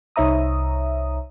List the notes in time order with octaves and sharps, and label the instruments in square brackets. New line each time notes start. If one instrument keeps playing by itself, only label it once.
[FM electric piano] C2 D#4 C#5 E5 A#5 D#6